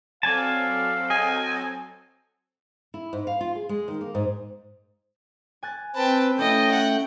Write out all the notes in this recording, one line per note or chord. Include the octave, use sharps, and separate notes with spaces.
F#3 C4 A4 D5 F5 G#5 A5
D#5 G#5
E4
G#2
F5
F4
G#4
G#3
D#3
A#3
G#2
G#5 F#6 A6
C4 B4 G5 A5
A3 C#4 E4 A4 D#5 G5
F#5